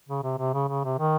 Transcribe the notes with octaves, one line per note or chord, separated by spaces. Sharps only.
C#3
C3
C3
C#3
C#3
C3
D#3